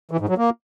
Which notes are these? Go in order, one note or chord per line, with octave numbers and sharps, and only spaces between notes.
E3
G#2
F#3
A#3